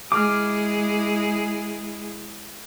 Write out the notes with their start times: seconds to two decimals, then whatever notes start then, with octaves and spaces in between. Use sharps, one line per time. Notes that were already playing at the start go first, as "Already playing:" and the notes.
0.12 G#3 E4 G#4 D6 F6